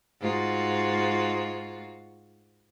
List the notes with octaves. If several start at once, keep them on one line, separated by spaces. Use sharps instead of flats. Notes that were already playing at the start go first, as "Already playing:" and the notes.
G#2 F4 F#4